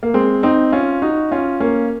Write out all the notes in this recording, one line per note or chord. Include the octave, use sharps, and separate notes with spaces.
A#3
G#3 C4
C4 D#4
C#4 F4
D#4 F#4
C#4 F4
A#3 C#4